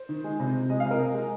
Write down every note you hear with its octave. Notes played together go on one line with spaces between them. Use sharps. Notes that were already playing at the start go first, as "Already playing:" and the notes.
Already playing: C5
D#3
G#3
C3
C3
G#3 D#5
F5
C3
A#4 D#5
G#3
G#3